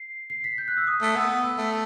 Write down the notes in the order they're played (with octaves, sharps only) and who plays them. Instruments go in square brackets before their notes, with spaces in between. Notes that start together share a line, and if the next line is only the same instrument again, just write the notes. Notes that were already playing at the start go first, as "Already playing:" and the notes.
Already playing: [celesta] C7
C7
B6
G6
F#6
E6
D#6
[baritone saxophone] A3
[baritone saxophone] B3 [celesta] E6
[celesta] E6
[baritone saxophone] A3